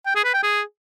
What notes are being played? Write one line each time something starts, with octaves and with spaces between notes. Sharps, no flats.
G5
G#4
B4
G5
G#4